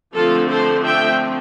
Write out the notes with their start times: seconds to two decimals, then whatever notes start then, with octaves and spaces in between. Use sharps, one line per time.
0.15 D3 F3 A3 C4 F4 A4
0.49 A4 C5
0.84 E5 G5